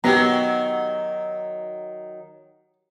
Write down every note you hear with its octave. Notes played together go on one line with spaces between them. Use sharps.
D#3 F#3 B3 F#4 G4 A#5